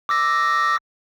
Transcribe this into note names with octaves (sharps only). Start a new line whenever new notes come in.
D6 E6 A#6